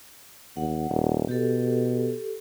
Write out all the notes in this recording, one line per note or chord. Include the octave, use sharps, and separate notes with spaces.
D#2 F#5
D#1
B2 G4 A4